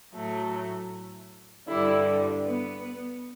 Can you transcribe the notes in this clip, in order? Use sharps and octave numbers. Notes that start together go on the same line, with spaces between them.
A2 F#3 A3
G2 D3 G3 E4
B3 B4